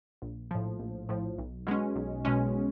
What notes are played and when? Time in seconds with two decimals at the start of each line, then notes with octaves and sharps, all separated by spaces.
0.22 A#1
0.51 A2 F3
0.80 A#1
1.09 A2 F3
1.38 B1
1.67 B2 G#3 C#4
1.96 B1
2.25 B2 G#3 C#4